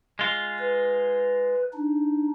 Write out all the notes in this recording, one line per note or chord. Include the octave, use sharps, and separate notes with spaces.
G#3 F4
B4
D4 D#4